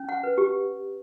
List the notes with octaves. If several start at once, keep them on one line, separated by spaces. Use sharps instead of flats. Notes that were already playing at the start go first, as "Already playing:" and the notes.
Already playing: C#4
F#5
B4
G4